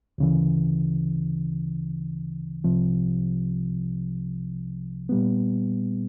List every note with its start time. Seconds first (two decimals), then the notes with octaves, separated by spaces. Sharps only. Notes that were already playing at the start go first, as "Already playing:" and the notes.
0.18 D2 C#3 E3
2.64 C2 C3 F3
5.09 A#2 G3 B3